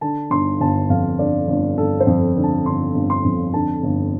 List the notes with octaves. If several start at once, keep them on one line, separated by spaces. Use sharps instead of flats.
D3 A5
G1 C6
G1 A5
F2 F5
D3 D5
G1
G1 A4
C5
F2
D3
A5
G1 C6
G1
C6
F2
D3 A5
G1